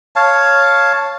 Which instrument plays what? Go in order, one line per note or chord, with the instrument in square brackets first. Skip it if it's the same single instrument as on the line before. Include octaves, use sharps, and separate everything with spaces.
[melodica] C#5 F5 A5